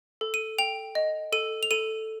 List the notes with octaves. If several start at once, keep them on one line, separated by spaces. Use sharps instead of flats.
A4
D#7
G5 F7
D#5
A4 D#7
F7
A4 D#7